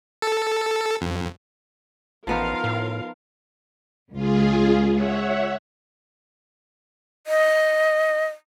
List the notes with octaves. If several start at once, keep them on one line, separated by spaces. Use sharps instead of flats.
A4
F2
A1 F3 B3 D#4 F4 A#4 F5
A2
C#2 F4 G#4
C#5 E5 F#5
D#5